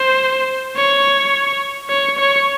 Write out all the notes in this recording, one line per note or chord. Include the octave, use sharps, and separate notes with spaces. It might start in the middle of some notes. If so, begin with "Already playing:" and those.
Already playing: C5
C#5
C#5
C#5